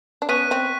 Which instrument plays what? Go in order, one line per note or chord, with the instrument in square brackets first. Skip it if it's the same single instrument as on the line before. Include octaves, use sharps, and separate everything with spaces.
[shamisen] D4
[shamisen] B3 C#4 [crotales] C#6 F#6 B6 D#7
[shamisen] C4